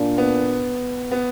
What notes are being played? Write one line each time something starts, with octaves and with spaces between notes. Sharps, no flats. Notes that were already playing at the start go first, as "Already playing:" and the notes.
Already playing: A#2 A#3 D4
B3
B3